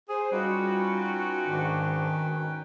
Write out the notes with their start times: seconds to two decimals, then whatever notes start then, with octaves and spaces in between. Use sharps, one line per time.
0.09 G#4 C5
0.32 G3 C#4 D#4 F4 F#4 B4 G5
1.46 G#2 D#3 D4
2.40 D#4